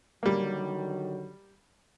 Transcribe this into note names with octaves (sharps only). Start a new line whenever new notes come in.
D3 D#3 F#3 G3 A#3